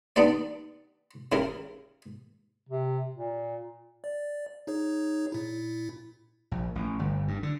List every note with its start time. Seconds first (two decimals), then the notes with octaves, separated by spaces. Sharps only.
0.16 B3 D4 D#4 G4 D5
1.32 C#3 E4 G4 A#4
2.69 C3
3.15 A#2
4.04 D5
4.67 D#4 G#4 C#5
5.32 A#2 E4
6.51 A#1
6.75 A1
6.99 G1
7.28 G2
7.43 D3